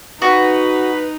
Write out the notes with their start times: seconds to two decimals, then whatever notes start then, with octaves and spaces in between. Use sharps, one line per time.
0.22 D#4 F#4 B4